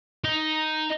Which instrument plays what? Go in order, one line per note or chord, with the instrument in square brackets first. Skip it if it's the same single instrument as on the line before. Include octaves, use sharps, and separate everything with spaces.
[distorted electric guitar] D#4